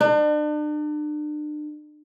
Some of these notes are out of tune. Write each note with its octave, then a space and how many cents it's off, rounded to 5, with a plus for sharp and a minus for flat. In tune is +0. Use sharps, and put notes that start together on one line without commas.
D4 +40